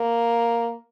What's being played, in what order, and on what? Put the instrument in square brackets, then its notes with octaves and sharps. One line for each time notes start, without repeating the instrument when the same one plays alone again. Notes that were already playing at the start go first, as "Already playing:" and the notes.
Already playing: [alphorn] A#3